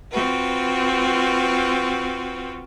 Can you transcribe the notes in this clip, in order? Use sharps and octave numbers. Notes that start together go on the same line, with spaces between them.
C4 F4 F#4 B4